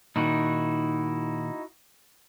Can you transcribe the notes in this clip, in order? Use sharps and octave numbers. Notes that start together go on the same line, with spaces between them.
A#2 D#3 D#4 E4 F#4